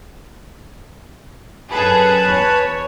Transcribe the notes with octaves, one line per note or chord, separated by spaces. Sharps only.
F#2 G#4 A4 B4 A5 B5
E2 C#5